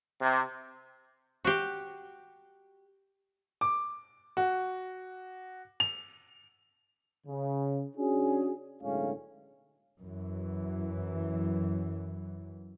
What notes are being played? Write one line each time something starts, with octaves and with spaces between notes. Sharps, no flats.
C3
F#4 G4
D6
F#4
F7
C#3
C#4 D4 F#4 G#4
B1 A2 D3 G#3 C#4 F5
F#2 E3 F#3